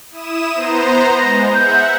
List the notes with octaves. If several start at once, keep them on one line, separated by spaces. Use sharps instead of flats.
E4 D#6 E7
B3 C5 A#5
G#3 A#6
E5 F#5 G6